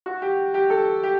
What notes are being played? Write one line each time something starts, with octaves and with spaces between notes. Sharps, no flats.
F#4
G4
G4
A4
G4